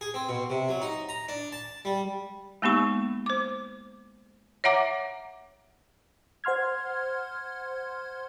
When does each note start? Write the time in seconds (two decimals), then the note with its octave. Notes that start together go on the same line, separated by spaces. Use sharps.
0.01 G#4
0.14 C4
0.29 B2
0.50 C3
0.69 F#3
0.82 D#4
1.09 A#5
1.29 D4
1.52 A5
1.85 G3
2.62 G#3 A#3 B3 D#4 G4 C#6
3.26 C5 D6
4.64 C#5 E5 F#5 A#5 D6
6.44 C5 F#5 C6 F6 G#6